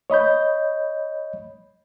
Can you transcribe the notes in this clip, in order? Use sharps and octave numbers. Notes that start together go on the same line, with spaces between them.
C#5 D#5 B5 G6